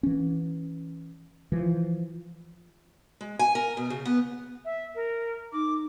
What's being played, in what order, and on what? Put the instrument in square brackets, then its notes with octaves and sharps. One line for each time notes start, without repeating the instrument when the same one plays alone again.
[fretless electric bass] E3 C#4
E3 F3
[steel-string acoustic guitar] G#3
G#5
A#4
B2
C#3
B3
[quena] E5
A#4
[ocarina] D#4 [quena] D6